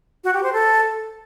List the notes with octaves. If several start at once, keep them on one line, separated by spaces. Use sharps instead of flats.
F#4
G4
C5
A4